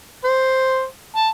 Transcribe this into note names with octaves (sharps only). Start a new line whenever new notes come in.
C5
A5